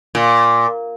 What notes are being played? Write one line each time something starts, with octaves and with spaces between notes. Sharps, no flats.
A#2